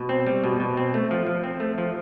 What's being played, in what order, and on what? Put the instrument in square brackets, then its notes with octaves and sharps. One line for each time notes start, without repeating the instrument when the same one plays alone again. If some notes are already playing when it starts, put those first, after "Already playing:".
Already playing: [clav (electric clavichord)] B2
C4
G3
B2
B2
C4
A3
F3
F3
C4
A3
F3